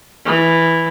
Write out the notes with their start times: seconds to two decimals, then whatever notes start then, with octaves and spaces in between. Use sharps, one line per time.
0.26 E3